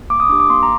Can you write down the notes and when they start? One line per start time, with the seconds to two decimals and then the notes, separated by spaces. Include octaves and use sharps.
0.10 A#3 D6
0.20 D#6
0.29 D4 G4 D6
0.40 D6
0.49 A#3 C6
0.63 A#5